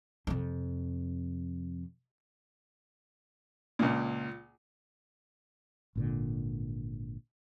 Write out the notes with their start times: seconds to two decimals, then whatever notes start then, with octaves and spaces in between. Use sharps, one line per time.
0.27 F2 C3
3.79 C#2 A#2
5.95 G#1 A#2 D3